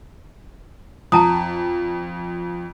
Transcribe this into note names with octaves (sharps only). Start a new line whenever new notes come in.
F2 A5 A#5 D#6